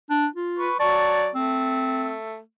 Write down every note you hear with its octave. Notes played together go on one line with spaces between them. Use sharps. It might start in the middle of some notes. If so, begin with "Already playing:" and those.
D4
F4
B4 C#6
F#3 D5 A5 C#6
A3 C4